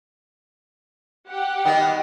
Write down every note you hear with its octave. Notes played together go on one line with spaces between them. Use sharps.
G4 F#5
D#3 G3 B3